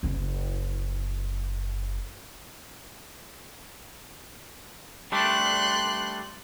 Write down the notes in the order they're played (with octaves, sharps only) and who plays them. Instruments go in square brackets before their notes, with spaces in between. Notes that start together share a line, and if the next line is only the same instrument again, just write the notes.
[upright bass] F#1 E4
[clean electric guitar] G3 A3 D4 [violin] C6 F#6